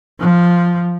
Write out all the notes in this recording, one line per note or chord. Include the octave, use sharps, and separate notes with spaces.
F3